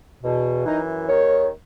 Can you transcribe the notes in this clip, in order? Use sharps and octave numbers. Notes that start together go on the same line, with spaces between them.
E2 B2
F#2 E3 D#4
D#2 D#3 C#5